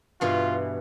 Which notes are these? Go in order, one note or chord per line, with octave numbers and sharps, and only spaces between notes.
G2 B2 E3 F4